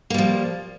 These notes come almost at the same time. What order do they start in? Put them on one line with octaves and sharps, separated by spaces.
A#3 G3 F3